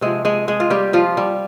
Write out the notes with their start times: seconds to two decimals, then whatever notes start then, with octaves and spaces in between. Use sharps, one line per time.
0.01 C3 F3 G#3 G#4
0.25 G#3 G#4
0.48 G#3 G#4
0.60 F4
0.70 G3 G4
0.93 F3 F4
1.17 G3